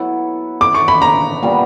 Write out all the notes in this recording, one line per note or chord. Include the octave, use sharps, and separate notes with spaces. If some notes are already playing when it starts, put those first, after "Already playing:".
Already playing: F#3 B3 E4 A4
D6
C#6
B5
A#5
A#2 G3 B3